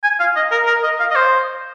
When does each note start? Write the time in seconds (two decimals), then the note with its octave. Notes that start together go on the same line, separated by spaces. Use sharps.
0.03 G#5
0.20 F5
0.36 D#5
0.51 A#4
0.67 A#4
0.83 D#5
0.99 F5
1.11 D#5
1.15 C5